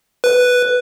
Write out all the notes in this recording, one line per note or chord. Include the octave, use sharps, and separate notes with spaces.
B4